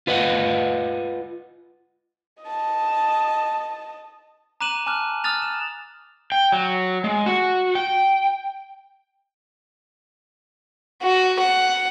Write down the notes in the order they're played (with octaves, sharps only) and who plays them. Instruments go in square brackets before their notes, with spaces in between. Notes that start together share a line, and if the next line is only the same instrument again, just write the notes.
[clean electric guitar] F4 B4 D#5 F#5
[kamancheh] D#5 A5
[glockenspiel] A#5 D6 F#6 D#7 E7 F#7
G#5 A5 D6 F6 F#6
D#6 F6 F#6 A6 F7
E7
[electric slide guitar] G5
F#3
G#3
F#4
G5
[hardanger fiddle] F#4
F#5